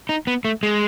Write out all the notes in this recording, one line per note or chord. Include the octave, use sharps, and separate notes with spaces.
D#4
B3
A3
G#3